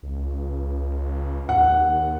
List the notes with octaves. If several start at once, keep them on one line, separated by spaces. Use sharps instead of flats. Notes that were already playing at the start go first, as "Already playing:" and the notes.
C#2
D#2 F#5